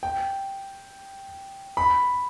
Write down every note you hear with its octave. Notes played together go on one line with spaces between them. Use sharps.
G5
B5